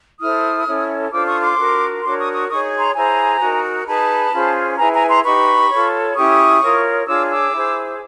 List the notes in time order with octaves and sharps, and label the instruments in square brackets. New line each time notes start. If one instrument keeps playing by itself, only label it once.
[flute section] E4 A4 C5 D#6 F6
C#4 E4 A4 C#5
D4 F4 A4 C5 D6 E6
C#6 D#6
C6 D6
D4 F#4 A#4
D4 F#4 A#4 C#5 C6 D6
C#6 D#6
C#6 D#6
D#4 G#4 C#5 C#6 D#6
A#5 C6
E4 G#4 C5 G#5 A#5
D#4 F#4 A#4
D#4 G#4 B4 A5 B5
C#4 F4 G#4 C5
E4 G#4 B4 G#5 A#5
G#5 A#5
A#5 C6
D#4 G4 B4 B5 C#6
F4 A4 C#5
C#4 E4 G4 C#6 D#6
F4 A#4 C#5
D4 F4 G#4 C#5 D6 E6
D6 E6
E4 G#4 C5